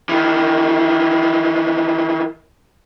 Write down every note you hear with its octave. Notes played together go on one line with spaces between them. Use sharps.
D#3 E3